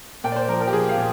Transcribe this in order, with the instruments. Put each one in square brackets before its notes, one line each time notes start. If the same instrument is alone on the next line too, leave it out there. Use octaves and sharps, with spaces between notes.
[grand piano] A#2 G5
D5
C5
F3 A#4
A#4
G4
F3 G#4
F5
A#2